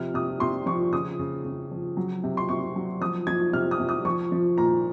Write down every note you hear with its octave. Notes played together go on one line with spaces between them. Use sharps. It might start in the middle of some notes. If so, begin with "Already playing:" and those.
Already playing: C3 F3 F6
C3 D#6
C3 C6
F3 C#6
C#3 D#6
C#3
C#3
F3
F#3
C3
C6
C3 C#6
F#3
F3 D#6
F3 G#6
C3 F6
D#6
C3
D#6
F3 C#6
F3
A#2 A#5